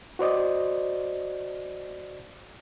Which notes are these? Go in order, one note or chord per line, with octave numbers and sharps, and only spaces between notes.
F#4 C5 D5 D#5